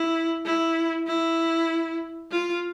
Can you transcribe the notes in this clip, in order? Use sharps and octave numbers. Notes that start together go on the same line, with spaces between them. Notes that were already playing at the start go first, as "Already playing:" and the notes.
Already playing: E4
E4
E4
F4